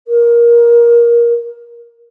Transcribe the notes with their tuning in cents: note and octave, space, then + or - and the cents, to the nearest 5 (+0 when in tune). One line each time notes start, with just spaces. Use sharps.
A#4 +20